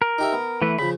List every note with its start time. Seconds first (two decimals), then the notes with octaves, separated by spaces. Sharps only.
0.02 A#4
0.18 D#4 G4 E5
0.32 B3
0.62 E3 A3 B4
0.79 C#3 F3 B5